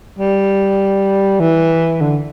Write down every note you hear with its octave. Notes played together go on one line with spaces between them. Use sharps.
G3
E3
D3